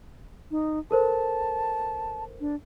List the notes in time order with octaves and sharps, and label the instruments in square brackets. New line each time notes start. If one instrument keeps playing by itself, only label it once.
[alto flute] D#4
[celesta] A4 A#4 C5 [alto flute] A5
[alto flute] D4